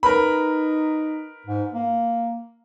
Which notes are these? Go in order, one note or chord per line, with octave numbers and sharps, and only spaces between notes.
D#4 A#4 B4 B5
G#2
A#3